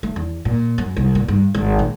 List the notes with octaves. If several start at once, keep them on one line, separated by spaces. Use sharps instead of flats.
A3
E2
A#2
F#2
C2
A#2
G2
G#1
A#2